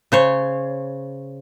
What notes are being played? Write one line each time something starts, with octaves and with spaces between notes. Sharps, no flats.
C#3 C5 C#5